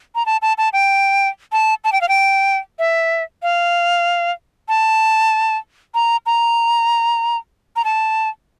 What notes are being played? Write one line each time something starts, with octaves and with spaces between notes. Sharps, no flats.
A#5
A5
A5
A5
G5
A5
A5
G5
F5
G5
E5
F5
A5
A#5
A#5
A#5
A5